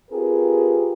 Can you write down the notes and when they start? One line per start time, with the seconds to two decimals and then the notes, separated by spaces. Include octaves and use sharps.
0.11 C4 F4 G4 G#4 A#4 B4